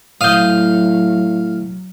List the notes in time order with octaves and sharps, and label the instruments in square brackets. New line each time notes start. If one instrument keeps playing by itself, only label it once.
[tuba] A2 [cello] F#3 [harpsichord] F5 [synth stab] D#6 G6